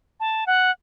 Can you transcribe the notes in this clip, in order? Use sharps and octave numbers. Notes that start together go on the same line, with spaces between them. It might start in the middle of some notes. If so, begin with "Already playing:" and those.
A5
F#5